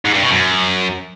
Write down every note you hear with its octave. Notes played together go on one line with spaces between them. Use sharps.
G#2
G2
B2
F#2